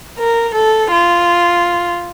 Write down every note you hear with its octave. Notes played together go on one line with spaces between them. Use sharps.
A#4
A4
F4